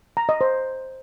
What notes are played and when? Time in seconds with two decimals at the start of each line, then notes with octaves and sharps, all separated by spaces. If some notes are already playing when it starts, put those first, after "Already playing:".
0.17 A#5
0.29 D#5
0.41 C5